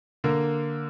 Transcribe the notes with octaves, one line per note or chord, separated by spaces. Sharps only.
D3 A#3 A#4